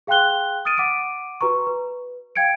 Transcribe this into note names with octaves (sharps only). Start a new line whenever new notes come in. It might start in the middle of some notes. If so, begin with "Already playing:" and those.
G#4 F5 G5 C6 F#6 G7
D#6 F6 A6 D7 D#7
F#5 D6 D7 D#7
F#4 B4 A#5 C#6
B4
F5 G5 G#6 C#7 D7